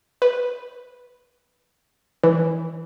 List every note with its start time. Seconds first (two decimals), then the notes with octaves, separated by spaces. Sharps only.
0.22 B4
2.24 E3